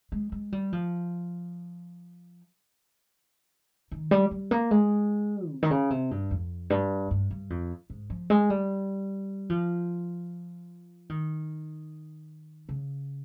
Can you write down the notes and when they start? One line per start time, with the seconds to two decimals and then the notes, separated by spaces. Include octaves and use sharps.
0.12 G#3
0.32 G#3
0.52 G3
0.73 F3
3.91 D#3
4.11 G3
4.31 G3
4.51 A#3
4.71 G#3
5.50 C3
5.63 D#3
5.71 C#3
5.90 C3
6.11 G2
6.31 F2
6.70 G2
7.11 G2
7.31 G2
7.50 F2
7.90 G#2
8.10 F3
8.30 G#3
8.50 G3
9.50 F3
11.10 D#3
12.69 C#3